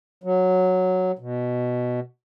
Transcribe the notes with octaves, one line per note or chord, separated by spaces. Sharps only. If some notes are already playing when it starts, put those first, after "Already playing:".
F#3
B2